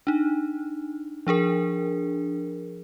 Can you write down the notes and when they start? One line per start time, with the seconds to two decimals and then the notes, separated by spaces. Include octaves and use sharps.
0.07 D4 D#4
1.27 F3 D4 G#4 A#4